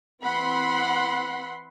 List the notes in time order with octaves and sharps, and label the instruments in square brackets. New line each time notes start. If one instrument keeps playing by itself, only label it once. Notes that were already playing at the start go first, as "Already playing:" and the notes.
[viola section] E3 C4 F#5 B5 C6